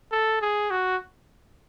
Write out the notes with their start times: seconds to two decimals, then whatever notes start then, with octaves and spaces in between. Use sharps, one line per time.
0.12 A4
0.42 G#4
0.71 F#4